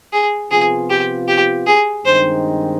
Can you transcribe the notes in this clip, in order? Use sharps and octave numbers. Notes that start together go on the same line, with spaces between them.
G#4
C3 F3 B3 F4 G#4
G4
G4
G#4
G2 D#3 G#3 C4 D#4 C5